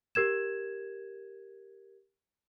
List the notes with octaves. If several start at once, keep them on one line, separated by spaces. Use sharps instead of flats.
G4 A#4 G#6 E7